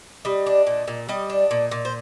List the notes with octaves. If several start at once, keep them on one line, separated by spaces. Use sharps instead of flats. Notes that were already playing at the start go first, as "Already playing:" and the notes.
G3 D#5
D4
A#2
A#2
G3 D#5
D4
A#2
A#2
C5